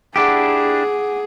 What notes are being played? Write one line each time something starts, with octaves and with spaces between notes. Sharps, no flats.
D4 E4 G4 G#4 F#5 D6 D7